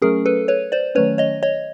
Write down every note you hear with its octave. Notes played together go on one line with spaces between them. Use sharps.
F#3 A3 C#4 G#4 A#4
A4 B4
B4 C#5
C5 D5
D#3 F#3 A3 C#4 B4 C#5
C#5 D#5
C#5 D#5